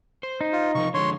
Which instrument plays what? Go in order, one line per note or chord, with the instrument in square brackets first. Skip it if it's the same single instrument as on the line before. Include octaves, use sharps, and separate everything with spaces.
[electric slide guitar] C5
[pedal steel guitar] D#4
[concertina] F4
[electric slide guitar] C3 F3 A#4 [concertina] C#6
[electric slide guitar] D3 F3 G#3 [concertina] C#5 C6